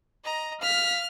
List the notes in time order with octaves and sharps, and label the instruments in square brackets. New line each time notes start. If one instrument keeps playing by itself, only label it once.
[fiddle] D#5 A#5
[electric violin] F5 B6 [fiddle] F6